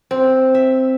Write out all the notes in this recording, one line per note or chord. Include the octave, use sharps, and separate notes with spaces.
C4
E5